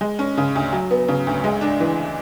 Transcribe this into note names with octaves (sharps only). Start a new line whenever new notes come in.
G#3
C#4
C#3
D2
F#3
B3
C#3
D2
G#3
D4
E3